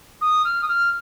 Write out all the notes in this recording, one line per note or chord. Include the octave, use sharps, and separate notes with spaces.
D#6
F6
D#6
F6